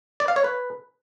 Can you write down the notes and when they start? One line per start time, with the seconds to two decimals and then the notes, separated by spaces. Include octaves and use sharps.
0.20 D5
0.28 F5
0.36 C#5
0.44 B4